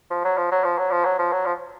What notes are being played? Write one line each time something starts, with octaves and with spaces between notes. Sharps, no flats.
F3
F#3
F3
F#3
F3
F#3
F3
F#3
F3
F#3
F3